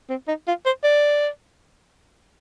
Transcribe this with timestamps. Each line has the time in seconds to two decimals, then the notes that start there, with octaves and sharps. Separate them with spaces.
0.10 C4
0.28 D#4
0.47 F4
0.66 C5
0.84 D5